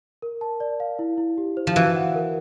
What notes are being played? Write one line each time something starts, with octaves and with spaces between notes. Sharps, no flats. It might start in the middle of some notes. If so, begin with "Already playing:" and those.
A#4
A5
D5
F5
E4
E4
G4
C5
F3
E3 F#4
F#5
A#4